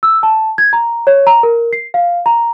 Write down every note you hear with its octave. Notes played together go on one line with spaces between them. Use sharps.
E6
A5
G#6
A#5
C#5
A#5
A#4
C7
F5
A#5